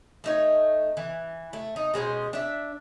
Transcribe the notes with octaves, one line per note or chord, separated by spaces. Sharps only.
A3 D#4 C#5
E3
A3
D#4
B2 G#3 C#4 C5
D4 E5